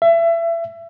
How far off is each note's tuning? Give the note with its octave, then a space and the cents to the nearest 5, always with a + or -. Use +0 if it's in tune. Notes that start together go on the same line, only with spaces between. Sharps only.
E5 +30